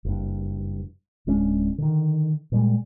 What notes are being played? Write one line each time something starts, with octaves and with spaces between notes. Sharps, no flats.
F#1 G2
D1 G#3 C#4 D4
D3 D#3
A#2 G3 G#3